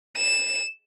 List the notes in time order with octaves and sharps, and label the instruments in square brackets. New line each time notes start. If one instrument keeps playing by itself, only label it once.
[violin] E7